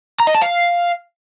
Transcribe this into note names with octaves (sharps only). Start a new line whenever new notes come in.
A#5
D#5
A5
F5